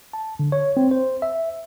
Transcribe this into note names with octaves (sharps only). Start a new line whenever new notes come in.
A5
D3
C#5
C4
C5
E5